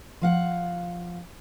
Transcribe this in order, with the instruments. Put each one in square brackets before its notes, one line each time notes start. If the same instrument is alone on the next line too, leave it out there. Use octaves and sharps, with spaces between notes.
[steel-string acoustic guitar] F3 F5 F#5